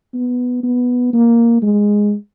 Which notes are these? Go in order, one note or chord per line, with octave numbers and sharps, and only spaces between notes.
B3
B3
A#3
G#3